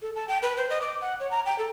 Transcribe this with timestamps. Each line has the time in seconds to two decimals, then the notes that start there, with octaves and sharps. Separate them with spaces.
0.02 A4
0.15 A5
0.28 G5
0.42 B4
0.57 C5
0.70 D#5
0.81 D6
1.01 F#5
1.20 C#5
1.31 A#5
1.46 G5
1.58 A4